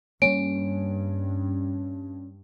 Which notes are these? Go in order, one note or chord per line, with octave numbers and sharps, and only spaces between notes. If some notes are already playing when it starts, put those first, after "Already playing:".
G2 G3 G#3 A#3 C#4 D7